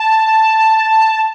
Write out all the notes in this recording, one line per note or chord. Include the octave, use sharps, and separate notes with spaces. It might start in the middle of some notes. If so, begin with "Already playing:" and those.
Already playing: A5